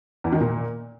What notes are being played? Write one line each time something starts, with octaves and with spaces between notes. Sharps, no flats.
E2
D#3
A#2